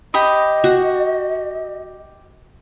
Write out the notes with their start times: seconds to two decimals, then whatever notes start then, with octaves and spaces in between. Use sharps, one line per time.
0.14 G4 D#5 B5 D#6
0.64 F#4